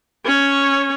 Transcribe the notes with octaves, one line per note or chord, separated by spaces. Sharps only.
C#4 C#5